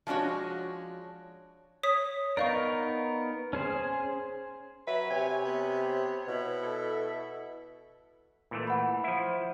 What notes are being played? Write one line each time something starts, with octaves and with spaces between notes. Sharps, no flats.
F3 G#3 D4 F#4 C#5
C#5 D#6 B6
B3 D#4 A#4 D5 F5 C#6
C#4 G#4 C5
F#3 B4 E5
C3 C#5 G#5
B3
B2 E4
A4
A#2 E3 A3
F#5 B5
F3 E4